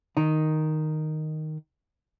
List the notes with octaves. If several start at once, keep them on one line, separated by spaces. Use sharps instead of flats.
D#3 D#4